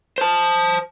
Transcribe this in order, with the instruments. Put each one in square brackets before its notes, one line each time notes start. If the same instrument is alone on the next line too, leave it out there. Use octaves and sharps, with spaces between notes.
[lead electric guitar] C5 A5